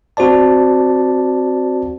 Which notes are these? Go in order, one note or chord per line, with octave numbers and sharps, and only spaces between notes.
C4 F#4 C5 D5 A5